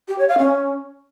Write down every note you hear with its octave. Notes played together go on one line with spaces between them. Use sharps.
G4
C#5
F5
C#4